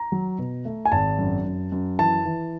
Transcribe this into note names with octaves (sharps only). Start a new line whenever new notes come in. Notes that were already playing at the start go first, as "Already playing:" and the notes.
Already playing: A#5
F#3
B2
A3
G#5
G#1 A5
F#2
F#2
F#2
E3 A5
E3